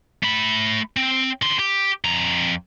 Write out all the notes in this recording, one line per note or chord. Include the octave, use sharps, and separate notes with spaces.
A3 B5
C4
D3 C6
G4
F2 A#5